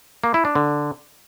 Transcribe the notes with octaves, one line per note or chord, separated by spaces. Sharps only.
A#3
E4
D4
D3